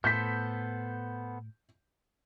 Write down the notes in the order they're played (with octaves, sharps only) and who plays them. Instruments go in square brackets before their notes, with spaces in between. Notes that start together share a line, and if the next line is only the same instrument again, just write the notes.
[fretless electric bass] A2 [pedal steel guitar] B3 A4 C5 [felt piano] G6 B6